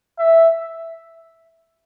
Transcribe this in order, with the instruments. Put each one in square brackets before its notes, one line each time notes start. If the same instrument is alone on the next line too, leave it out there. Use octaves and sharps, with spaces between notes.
[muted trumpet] E5